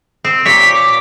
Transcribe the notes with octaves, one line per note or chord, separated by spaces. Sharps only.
C4
A#2 G4 C#5 B6
D6